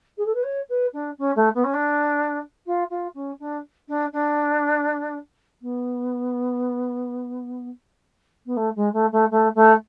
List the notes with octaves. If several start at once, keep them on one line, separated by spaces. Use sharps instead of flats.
G#4
A4
B4
C#5
B4
D4
C#4
A3
B3
C#4
D4
F4
F4
C#4
D4
D4
D4
B3
B3
A3
G#3
A3
A3
A3
A3